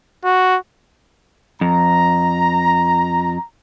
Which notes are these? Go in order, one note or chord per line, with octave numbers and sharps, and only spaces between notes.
F#4
F2 A#5